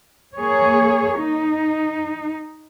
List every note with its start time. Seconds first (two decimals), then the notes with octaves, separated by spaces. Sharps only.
0.35 A#3 G#4 C#5
1.20 D#4